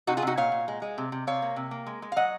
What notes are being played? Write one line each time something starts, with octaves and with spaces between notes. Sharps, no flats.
C3 D#4 F#4
F4 G#4
C3 D#4 F#4
A#2 C#5 F5
A#2
G#3
G#3
C3
C3
C3 C#5 F5
A#3
C3
A#3
G#3
G#3
F5
F#3 D#5 F#5